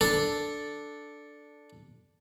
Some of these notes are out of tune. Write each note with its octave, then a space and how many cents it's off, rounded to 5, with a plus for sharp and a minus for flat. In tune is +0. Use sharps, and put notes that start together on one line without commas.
D4 +0 A4 +0